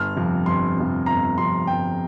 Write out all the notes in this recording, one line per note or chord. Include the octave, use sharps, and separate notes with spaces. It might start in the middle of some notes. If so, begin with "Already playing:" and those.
Already playing: G1 F6
F2 C3
G1 C6
F2 C3
G1 A#5
F2 C3 C6
G1 G5